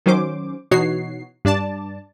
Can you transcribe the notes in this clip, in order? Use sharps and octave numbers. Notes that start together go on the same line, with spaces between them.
D#3 F#3 C#4 C5 D6
B2 E3 D#4 F#4 C#5 C7
G2 D4 D5 A5